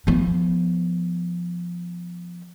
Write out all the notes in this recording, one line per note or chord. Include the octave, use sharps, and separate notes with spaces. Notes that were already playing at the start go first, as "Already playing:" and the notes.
F3 B3